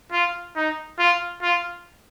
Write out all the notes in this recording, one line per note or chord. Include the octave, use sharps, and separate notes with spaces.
F4
D#4
F4
F4